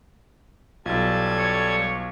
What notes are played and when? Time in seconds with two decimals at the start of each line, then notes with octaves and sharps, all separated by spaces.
0.86 B1 G3 F4 A4 G#6
1.39 C#5